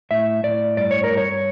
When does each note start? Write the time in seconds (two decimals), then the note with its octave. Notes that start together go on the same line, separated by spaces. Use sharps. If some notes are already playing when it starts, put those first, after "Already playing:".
0.11 A2 E5
0.43 A2 D5
0.77 G2 D5
0.91 C#5
1.04 A#4
1.11 G2
1.17 C#5